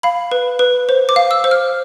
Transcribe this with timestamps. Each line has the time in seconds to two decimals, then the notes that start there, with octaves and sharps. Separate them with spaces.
0.03 F5 B5
0.31 B4
0.59 B4
0.89 C5
1.09 D6
1.16 F5
1.31 E6
1.44 C5
1.51 F6